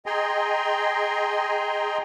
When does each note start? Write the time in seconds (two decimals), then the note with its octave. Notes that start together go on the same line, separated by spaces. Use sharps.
0.06 G#4 D#5 G5 G#5 A#5 C6